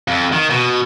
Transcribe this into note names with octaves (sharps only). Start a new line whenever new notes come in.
F2
D#3
B2